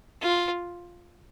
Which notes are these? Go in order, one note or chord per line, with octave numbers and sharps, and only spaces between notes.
F4